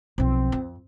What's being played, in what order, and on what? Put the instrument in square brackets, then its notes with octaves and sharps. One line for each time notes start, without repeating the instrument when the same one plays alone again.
[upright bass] B1 F3 [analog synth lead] C4
[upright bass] F2